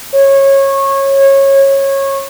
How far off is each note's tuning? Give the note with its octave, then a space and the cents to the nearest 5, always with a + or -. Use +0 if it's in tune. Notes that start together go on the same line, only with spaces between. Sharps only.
C#5 -20